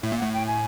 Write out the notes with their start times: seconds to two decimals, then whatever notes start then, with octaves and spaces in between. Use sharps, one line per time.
0.03 A2 E5
0.12 A#2
0.18 A2 F#5
0.33 G5
0.46 G#5